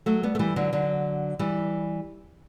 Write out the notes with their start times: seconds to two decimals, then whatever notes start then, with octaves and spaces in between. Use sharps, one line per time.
0.06 F#3 A3
0.23 G3 B3
0.35 A3
0.39 E3 G3
0.56 D3 F#3
0.73 D3 F#3
1.39 E3 G3